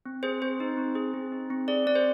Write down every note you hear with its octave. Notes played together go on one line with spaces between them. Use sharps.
C4
G#4 C5
C4 C5
D#4
C4
G#4
C4
D#4
C4
G#4 D5
C4 D5
C5